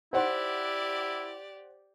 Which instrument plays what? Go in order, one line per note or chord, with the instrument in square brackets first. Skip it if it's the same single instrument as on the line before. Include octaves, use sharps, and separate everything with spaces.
[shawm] E4 [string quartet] G4 D5 [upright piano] C5 F#5 C6